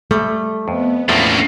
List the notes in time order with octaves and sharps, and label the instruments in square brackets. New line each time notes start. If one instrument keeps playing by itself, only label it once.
[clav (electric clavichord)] G3 [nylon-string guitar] A3
[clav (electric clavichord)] F2 [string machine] B3
[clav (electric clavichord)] E2 A2 F3 [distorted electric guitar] A3 A#3 [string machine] C#4 D4